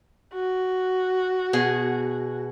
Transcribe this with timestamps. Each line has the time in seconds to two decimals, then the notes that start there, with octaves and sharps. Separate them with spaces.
0.34 F#4
1.53 B2 G#4 F#5